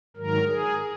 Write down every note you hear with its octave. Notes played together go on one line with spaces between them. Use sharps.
G#2 D#3 F#3 A#4
G#4